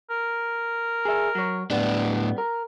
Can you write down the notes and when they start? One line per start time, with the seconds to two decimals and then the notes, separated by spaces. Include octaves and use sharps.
0.11 A#4
1.05 G#4 E5
1.35 F#3 C#5
1.71 A2 G3 B3 D4
2.38 A#4